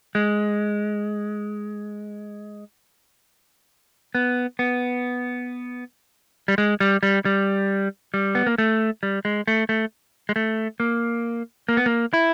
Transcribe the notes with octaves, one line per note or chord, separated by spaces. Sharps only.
G#3
B3
B3
G3
G#3
G3
G3
G3
G3
B3
A#3
A3
G3
G#3
A3
A3
G#3
A3
A#3
A#3
B3
A#3
E4